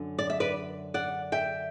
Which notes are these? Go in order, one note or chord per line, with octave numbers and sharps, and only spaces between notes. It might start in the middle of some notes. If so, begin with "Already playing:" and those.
Already playing: F#2 D3
D5
E5
B4 D5
D5 F#5
E5 G5